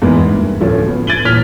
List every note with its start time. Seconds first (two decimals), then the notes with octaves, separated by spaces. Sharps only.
0.02 E2 G#2 G#3 A#3 B3 E4
0.26 G2
0.61 D1 D2 F3 A3 C#4
0.88 B3
1.07 G#6 A6 D7 D#7 F#7 G7
1.25 D#1 A#2 E3 F6 B6 F7